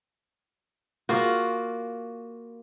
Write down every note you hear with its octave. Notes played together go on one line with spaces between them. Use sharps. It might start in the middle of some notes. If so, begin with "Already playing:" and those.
A#3 F4 F#4